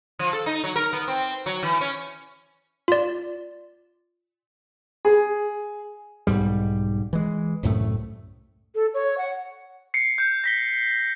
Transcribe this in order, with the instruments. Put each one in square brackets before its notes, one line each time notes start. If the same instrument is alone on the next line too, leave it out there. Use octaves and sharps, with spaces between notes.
[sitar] F3
A4
D#4
F#3
A#4
B3
C4
F#3
E3
C#4
[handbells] F4 D5
[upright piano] G#4
[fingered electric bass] B1 E2 G#2 G3
E3 G#3
C2 F#2 A2 A3
[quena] A4
C#5
F#5
[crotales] C7 C#7
G6 C#7
A#6 B6 G7